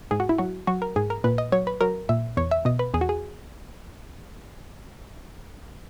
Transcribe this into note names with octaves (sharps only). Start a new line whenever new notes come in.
G#2 G#4
F#4
E4
F#3 F#4
F#3 F#4
A#4
G#2 G#4
A#4
A#2 B4
D#5
F#3 C#5
B4
F#3 A#4
A#2 E5
E2 C#5
E5
B2 D#5
B4
E2 G#4
F#4
G#4